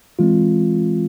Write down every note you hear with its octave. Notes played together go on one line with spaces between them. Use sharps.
E3 G#3 C4 F4